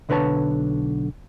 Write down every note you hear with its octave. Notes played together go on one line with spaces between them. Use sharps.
B1 D3 B4 C#5 A5